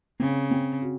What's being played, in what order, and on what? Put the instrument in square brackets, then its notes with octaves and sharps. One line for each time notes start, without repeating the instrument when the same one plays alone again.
[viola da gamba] C#3 [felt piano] C4
[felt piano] C4
F#4